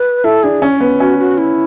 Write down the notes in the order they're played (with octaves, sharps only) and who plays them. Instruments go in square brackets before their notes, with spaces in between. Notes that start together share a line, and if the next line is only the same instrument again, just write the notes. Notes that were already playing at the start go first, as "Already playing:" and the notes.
Already playing: [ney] B4
[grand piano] E4 [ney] A4
[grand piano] D4 [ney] G#4
[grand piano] C#4
B3
[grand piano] C#4 [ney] F#4
[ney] F#4
E4